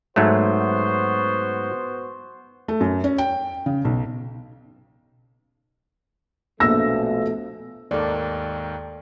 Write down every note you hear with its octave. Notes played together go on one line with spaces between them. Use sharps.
G#2 F#3 A3 B3 F#4 C5
A3
F#2
C#4
G5
C#3
B1
A#1 B2 F3 A3 E6 A#6
D#2 G#2 D#3 A4 D5